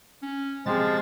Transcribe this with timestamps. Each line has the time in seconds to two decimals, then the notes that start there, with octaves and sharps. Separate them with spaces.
0.22 C#4
0.66 C3 F3 G#3 G4 G#4 A6